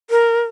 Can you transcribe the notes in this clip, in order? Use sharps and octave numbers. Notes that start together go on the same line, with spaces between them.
A#4